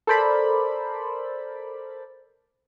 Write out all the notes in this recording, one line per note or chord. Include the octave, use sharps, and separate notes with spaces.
A4 A#4 C5 D5 B5